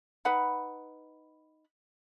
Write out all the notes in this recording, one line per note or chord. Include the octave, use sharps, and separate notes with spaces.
D#4 B4 F#5 B5